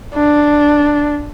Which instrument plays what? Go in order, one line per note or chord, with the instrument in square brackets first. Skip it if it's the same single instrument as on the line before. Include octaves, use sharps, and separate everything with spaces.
[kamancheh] D4